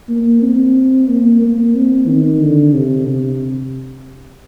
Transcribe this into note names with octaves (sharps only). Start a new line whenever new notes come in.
A#3
C4
A#3
A#3
C4
D#3
D3
C3
C3